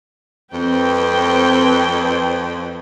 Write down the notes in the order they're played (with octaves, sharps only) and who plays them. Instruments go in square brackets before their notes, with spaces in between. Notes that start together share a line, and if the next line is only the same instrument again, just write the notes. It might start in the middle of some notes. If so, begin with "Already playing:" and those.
[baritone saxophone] F2 [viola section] C4 B4 G5